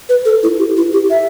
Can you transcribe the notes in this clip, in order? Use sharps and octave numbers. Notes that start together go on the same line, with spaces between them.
B4
A4
E4
G4
E4
G4
E5